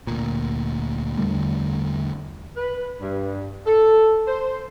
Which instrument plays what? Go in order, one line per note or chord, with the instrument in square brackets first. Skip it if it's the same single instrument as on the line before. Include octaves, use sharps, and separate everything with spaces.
[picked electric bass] D2 A#2
E2 D3 G3 A3
[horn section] B4
G2
A4
C5